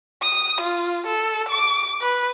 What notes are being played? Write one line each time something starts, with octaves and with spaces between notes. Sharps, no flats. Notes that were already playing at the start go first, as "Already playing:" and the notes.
D#6
F4
A4
D6
B4